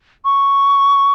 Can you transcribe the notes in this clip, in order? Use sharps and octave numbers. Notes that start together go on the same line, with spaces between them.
C#6